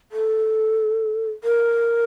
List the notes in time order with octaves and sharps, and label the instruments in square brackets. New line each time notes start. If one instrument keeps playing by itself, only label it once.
[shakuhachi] A4
A#4